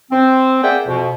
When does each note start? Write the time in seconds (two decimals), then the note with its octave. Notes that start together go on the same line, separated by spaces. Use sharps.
0.11 C4
0.63 A#3 G#4 D5 E5 F#5 G5
0.86 F2 B2